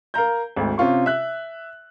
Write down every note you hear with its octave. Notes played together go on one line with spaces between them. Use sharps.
A#4 F5 A#5 G6
G#1 D2
C3 C#4 F4 C#6
E5 F#6